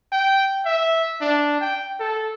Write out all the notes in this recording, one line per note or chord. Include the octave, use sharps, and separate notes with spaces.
G5
E5
D4
G5
A4